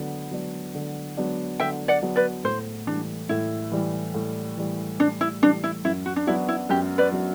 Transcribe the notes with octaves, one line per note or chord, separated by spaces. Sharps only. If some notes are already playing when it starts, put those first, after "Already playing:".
Already playing: D3 F#3 B3
F#3 B3 D4
D3
F#3 B3 D4
D3 E5 G5
D5 F#5
F#3 B3 D4
B4 D5
A2 C5
E3 G3 D4
A2 E4
E3 G3
A2
E3 G3
A2 D4
E4
E3 G3 D4
E4
F#2 E4
F#4
D4
F#3 B3 D4 E4 F#4
E4
F#2 G4
B4 D5
F#3 B3 D4 F#4